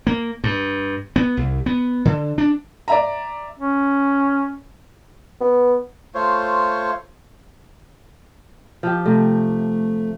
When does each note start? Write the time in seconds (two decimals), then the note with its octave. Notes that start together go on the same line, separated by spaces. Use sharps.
0.07 A#3
0.44 G2
1.16 B3
1.37 C2
1.66 B3
2.05 D3
2.38 D4
2.88 D5 E5 A#5
3.59 C#4
5.41 B3
6.15 A3 F4 C5 C#5
8.83 F3 G4
9.06 C3 A3